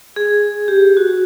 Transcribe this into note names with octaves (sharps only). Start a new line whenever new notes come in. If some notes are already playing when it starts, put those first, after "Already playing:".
G#4
G4
F#4